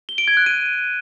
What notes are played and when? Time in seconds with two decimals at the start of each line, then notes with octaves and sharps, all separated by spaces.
0.09 G7
0.18 D7
0.28 G#6
0.37 F#6
0.46 D#7